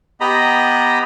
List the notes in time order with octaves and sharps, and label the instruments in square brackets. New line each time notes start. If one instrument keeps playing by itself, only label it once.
[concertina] B3 G4 D#5 A#5 B5